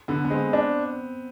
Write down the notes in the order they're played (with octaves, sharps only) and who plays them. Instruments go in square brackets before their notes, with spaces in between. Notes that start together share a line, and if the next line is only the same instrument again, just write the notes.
[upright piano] D3 [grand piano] B3
[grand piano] B3
[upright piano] G#3 [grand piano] C4
[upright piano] D4